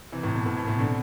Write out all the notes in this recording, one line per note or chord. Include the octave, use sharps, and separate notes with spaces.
C3 E3
A2 C3
B2
A2
B2
A2 C3
B2 D3